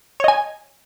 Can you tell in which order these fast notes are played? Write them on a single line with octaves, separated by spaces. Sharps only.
C#5 D#5 G#5